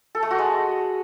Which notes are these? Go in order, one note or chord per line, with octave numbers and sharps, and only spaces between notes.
A4
A3
F#4
G#3